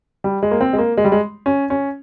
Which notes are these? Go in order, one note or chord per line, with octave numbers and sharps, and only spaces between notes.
G3
G#3
A#3
C4
G#3
A#3
G#3
G3
G#3
C#4
C#4